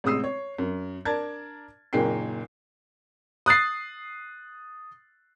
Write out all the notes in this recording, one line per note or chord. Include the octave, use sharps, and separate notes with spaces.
A1 C3 G#3 D#6 E6 C7
C#5
F#2
D4 A#4 D5 A5 G#6 A6
F#1 A#2 D#4 G#4 G5 C7
D#6 F#6 A6 C7